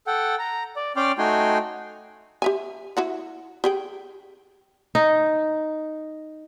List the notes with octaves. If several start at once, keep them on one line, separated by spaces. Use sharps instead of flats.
A4 F#5 G5
A#5
D5
C#4 D5 G5 C6 D6 F6
A3 D#4 F#4 G5 G#5 C6
G4 E5 G#5
E4 F#4 F#5
G4 G#4 G5
D#4